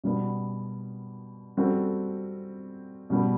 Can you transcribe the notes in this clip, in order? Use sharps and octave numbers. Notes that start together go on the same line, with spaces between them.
B2 G3 B3 D4
G3 C4 F#4 A4
B2 G3 B3